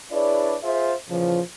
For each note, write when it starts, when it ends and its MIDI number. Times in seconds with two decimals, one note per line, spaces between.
0.12 0.56 62
0.12 0.56 64
0.12 0.56 68
0.12 0.56 71
0.12 0.56 73
0.12 0.56 74
0.63 0.93 65
0.63 0.93 68
0.63 0.93 72
0.63 0.93 76
1.10 1.41 46
1.10 1.41 49
1.10 1.41 52
1.10 1.41 53